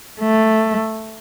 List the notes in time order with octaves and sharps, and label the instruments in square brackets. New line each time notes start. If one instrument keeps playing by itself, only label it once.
[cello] A3